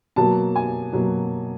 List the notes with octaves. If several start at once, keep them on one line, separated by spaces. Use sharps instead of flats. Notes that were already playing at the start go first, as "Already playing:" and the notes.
B2 F#3 A#3 A5
G#5
B2 F#3 A#3